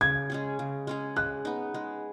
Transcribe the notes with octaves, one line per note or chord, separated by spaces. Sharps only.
C#3 G#6
G#3 C#4 G#4
C#3
G#3 C#4 G#4
G#3 F#6
B3 D#4
G#3